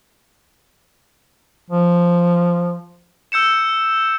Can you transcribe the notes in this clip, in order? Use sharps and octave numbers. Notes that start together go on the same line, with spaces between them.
F3
E6 G6 C#7 E7